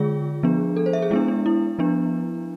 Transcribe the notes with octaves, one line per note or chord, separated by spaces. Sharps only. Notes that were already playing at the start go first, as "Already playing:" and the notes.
Already playing: D3 G#3 F4 G#4
F3 B3 D4
A4
C5
E5
G#4
G#3 B3 D4 E4
D4
E4
F3 B3 D4